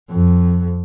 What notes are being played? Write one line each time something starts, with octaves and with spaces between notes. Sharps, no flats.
F2